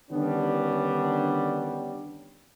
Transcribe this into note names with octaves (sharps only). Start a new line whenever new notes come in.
D3 D#3 G3 B3 C#4 D4